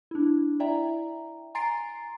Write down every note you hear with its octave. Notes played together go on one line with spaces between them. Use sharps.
D4 E4
E4 D5 E5 G5 A#5
G#5 A#5 C6 A6 C7 D7